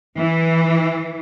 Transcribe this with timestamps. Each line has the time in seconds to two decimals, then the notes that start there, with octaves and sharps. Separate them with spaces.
0.18 E3